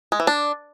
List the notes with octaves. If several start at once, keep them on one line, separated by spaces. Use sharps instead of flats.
G#3
E3
D4